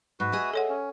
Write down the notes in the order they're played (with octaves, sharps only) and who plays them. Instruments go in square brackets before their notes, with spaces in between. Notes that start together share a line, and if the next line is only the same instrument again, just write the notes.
[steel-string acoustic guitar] G#2 [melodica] F#4 B4
[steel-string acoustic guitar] G#4 D#5 E5
[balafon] A4 C#5 F#5
[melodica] C#4